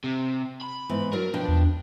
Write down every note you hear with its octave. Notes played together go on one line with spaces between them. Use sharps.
C3
B5
G#2 E3 B3
F#3 D4 A#4
B2 F3 D4 G5
E2